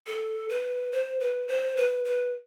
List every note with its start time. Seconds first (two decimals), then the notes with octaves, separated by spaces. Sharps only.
0.07 A4
0.49 B4
0.92 C5
1.20 B4
1.48 C5
1.77 B4
2.05 B4